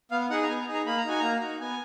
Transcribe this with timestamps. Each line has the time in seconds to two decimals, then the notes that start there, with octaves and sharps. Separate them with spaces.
0.11 B3 F5
0.30 D#4 G#4 F#5
0.43 A#5
0.49 B3 G#5
0.61 A#5
0.67 D#4 G#4
0.73 A#5
0.86 A#3 B5
0.97 A#5
1.05 D#4 F#4 G#5
1.20 A#3 A#5
1.41 D#4 F#4
1.60 B3 G#5